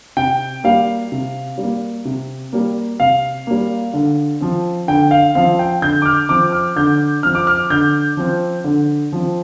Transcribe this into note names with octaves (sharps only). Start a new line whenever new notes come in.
C3 G5
G3 A#3 F5
C3
G3
A#3
C3
G3 A#3
C3 F5
G3 A#3
D3
F3 C4
D3 G5
F5
F3 C4 F5
G5
D3 G6
D6
F6
F3 C4 D6
F6
D3 G6
F3 C4 F6
D6
F6
D3 G6
F3 C4
D3
F3 C4